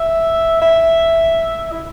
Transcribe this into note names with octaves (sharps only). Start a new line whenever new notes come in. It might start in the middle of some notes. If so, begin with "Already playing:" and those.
Already playing: E5
E5
E4